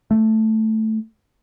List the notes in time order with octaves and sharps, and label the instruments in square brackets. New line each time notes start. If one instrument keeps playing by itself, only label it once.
[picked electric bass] A3